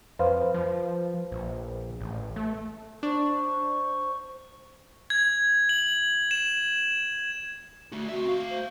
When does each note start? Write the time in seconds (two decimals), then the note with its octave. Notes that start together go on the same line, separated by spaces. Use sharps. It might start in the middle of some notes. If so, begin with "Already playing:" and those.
0.19 F2 B4 C5 F5
0.54 F3
1.32 A#1
2.01 A1
2.36 A3
3.03 D4 C5 C#6
5.10 G#6
5.69 F#7
6.31 E7
7.92 A3 F#4
8.09 C4 F#4 E5
8.29 A3 F5
8.50 C5